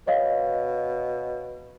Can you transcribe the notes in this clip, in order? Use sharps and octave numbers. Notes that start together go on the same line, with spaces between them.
B2 C#5 D#5 F5